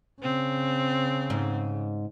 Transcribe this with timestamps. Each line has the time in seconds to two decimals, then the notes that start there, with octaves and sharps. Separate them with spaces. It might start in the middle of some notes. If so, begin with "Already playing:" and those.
0.22 C#3 C4
1.30 G#2